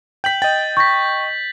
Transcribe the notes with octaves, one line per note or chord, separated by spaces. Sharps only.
G5 G6 B6 F#7
D#5 G5 A6
C#6 G6 A#6 B6